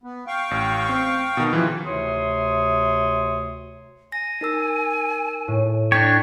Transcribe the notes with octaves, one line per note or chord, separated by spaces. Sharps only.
B3
F5 G5 C#6
A1
C4
B2 D#3
C#3 E3 F3
D2 C3 C#5 C6 D#6
G#5 A#6
D#4 A#4 E6
A2
D4 C#5 G5 G6 B6